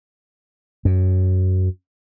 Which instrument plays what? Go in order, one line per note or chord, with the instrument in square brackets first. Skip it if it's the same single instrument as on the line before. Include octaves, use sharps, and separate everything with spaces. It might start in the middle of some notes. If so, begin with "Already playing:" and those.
[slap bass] F#2